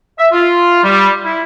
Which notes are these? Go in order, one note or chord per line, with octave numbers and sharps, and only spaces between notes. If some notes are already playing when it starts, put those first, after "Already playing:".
E5
F4
G3
E4